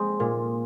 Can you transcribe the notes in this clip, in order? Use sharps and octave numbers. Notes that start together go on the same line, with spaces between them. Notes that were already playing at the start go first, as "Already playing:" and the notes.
Already playing: G#3 C4
A#2